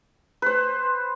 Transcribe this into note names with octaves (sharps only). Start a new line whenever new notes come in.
B4 C5